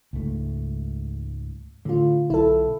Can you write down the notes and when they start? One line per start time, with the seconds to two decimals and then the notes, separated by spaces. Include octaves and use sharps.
0.13 C#2 G#2 A3
1.85 A2 D3 F4
2.30 B1 E4 A4